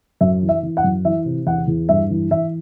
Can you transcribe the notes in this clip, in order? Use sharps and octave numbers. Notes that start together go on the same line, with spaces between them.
F#2 E5
E3
E5
E3
F#5
F#2
E3 E5
C3
E2 F#5
E2
G2 E5
E3
E3 E5